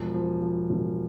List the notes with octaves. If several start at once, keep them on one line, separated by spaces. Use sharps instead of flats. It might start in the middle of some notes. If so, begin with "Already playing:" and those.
Already playing: E1 F3
F3
F3
E1